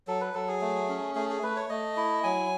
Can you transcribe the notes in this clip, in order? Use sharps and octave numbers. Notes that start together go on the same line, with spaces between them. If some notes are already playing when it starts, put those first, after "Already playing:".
F#3 A4
B4
F#3 A4
G#4
A3
C#4
A3 G#4
G#4
A3 B4
C#5
A3 D#5
E4
F#3 G#5